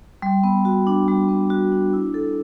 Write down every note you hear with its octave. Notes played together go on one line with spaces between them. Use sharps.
G3
B3
F#4
D4
G3
B3
F#4
D4
E4
A4